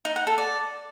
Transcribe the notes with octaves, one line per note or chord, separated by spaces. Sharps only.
D#4
F#5
A4
D5